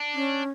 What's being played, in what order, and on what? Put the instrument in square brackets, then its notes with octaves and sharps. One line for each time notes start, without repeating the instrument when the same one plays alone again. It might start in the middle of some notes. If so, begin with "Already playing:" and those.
Already playing: [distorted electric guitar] D4
[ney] C#4